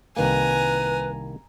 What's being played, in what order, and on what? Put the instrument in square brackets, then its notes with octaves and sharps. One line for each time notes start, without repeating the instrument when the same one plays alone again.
[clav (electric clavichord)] C2 D#3 A#3 [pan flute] B4 [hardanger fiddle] G#5 A#5